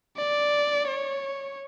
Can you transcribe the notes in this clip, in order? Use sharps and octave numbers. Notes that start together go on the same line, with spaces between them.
D5
C#5